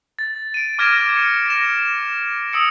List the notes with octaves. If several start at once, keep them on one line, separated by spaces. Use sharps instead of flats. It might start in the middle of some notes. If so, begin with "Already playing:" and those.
A6
D7 D#7
D6 F6 G#6 A#6 D7 E7
C#7
A#6 E7
D#6 E6 C#7 D7